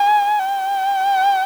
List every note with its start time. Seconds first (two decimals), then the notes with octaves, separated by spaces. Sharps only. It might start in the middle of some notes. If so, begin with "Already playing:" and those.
Already playing: G#5
0.40 G5